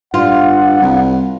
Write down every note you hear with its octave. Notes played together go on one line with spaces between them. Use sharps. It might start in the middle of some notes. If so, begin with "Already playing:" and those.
G2 F4 F#5
C2